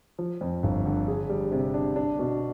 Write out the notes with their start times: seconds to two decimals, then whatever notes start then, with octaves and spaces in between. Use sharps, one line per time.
0.19 F3
0.41 F2
0.63 G1
0.86 D3
1.08 G#4
1.30 G3
1.52 C3
1.74 D4
1.96 D4
2.19 B2